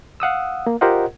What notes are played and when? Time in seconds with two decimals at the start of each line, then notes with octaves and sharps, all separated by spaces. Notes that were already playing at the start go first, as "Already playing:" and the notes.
0.20 F5 F#5 D#6 E6
0.67 A#3
0.81 F4 G4 A#4 C5 D#5 F#5